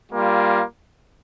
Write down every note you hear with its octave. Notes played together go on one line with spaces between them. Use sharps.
G3 A#3 F4